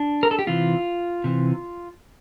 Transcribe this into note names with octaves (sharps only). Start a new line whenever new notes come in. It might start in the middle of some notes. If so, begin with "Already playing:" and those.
Already playing: D4
A#4
A4
G4
C3 E3 F4
C3 E3